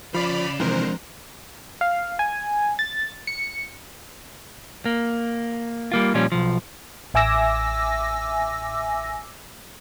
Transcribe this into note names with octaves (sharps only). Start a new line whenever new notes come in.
F3 C#4 D5 F5 B5
F2 C3 D#3 E3 G#3 D4 A#4 C5
F5
G#5
A6
C#7
A#3
G3 A#3 F4
A#2 F3 G3 C#4
B1 F3
A1 E5 G#5 D6 E6 A#6